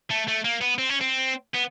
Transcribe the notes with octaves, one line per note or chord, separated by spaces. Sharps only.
A3
A3
A#3
B3
C4
C#4
C4
B3